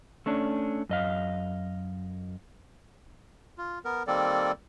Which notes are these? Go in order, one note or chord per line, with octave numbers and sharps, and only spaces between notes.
A3 C#4 D4
F#2 D#5 F5
F4
B3 A#4
D#3 G3 A#3 C4 A4 D5